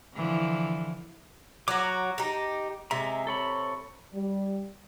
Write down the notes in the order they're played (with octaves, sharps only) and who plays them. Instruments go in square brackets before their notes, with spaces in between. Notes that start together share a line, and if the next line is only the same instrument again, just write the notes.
[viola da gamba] D3 E3 F3
[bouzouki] F#3 F#4 [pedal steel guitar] A#5 D6
[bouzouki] D#4 G4
[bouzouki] C3 [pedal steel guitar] G#3 E5 A#5
[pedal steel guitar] A4 C#5 B5
[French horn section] G3